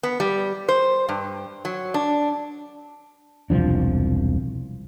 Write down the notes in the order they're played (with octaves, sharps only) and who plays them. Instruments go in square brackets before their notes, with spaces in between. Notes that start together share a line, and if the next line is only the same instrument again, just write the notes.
[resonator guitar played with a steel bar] B3
G3
C5
G2
F#3
D4
[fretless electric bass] E1 C2 F3 D4